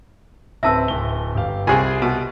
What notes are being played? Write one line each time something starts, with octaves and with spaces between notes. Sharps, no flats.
D1 C4 E4 B4 E5 A5 E6
D1 G7
G1 G4 F5
C2 C4 F4 G4 G#4 G#5
B2